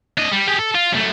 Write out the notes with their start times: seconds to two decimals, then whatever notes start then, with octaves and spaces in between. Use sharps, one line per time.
0.18 D4 D#5
0.32 G3
0.47 G4 G#4
0.59 A4
0.75 F4
0.92 F#2 A3